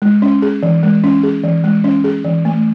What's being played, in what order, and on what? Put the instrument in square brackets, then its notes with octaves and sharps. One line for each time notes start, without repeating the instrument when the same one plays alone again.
[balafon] G#3
C#4
G#4
E3
G#3
C#4
G#4
E3
G#3
C#4
G#4
E3
A3